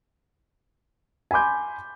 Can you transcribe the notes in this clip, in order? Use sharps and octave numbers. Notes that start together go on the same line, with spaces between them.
G#5 B5 C6 D6 G6